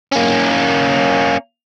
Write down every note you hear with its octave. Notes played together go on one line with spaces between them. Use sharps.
A#3 C#4